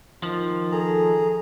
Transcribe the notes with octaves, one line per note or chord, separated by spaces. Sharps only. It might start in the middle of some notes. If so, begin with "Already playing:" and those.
D#3 F3
G#4 A4 A#5